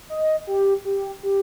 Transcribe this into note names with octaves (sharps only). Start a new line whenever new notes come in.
D#5
G4
G4
G4